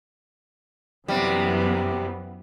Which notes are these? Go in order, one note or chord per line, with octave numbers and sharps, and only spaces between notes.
F#2 C3 E3 G3 B3